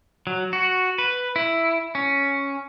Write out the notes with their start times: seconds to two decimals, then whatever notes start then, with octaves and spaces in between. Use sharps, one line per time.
0.27 F#3
0.53 F#4
0.98 B4
1.36 E4
1.95 C#4